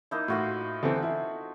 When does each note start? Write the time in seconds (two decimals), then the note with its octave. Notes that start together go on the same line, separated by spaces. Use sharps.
0.11 A#3 D#4 E4
0.28 A2 F4 F#4 F5
0.83 D3 E3 C4 A4
1.02 E4